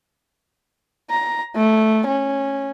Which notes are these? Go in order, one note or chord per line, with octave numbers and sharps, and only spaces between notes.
A#5
A3
C#4